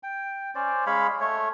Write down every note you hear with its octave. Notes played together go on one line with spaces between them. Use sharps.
G5
C#4 C5 D5
G#3 C#5 F5 B5
A3 C#5